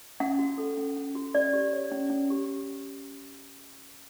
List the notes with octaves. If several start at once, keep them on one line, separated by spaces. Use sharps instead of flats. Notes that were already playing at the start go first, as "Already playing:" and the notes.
C#4 F#5
F#4
A4
C#4
C#4
F#4
C#4 D5
G4
C#5
C#4
C#4
G4